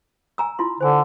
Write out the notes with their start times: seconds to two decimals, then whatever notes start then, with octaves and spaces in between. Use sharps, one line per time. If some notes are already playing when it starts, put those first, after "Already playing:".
0.38 G#5 A#5 E6
0.59 E4 F4 C6
0.81 D3 C5 G#5